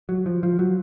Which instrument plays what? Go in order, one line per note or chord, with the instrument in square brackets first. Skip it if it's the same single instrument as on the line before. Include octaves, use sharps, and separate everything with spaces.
[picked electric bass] F#3
F3
F3
F#3